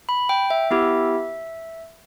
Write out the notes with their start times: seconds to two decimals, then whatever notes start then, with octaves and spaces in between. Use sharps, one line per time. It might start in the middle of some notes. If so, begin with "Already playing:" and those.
0.09 B5
0.29 G5
0.50 E5
0.71 B3 E4 G4